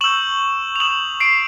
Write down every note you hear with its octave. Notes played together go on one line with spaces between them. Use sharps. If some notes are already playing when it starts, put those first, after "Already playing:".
C#6 E6 G6 E7 F#7
F7
D#6 G6 E7 F#7
C7 D7